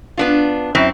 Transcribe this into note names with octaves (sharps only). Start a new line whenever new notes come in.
B3 D4 F4
F#2 C4 E4